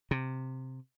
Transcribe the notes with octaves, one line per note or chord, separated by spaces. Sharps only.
C3